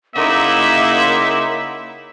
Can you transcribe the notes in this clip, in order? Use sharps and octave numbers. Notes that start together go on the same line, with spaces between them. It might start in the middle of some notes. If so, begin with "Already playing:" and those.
C#3 A#3 D#4 E4 E5 F#5 C6 D6